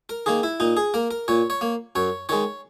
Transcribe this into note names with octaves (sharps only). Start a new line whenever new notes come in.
A#4
D#3 A#3 G#4
E4
A#2 D#4
G#4
A#3 A#4
A#4
A#2 C#5
C#5
A#3
F#2 C#5
D#3 G#3 C#5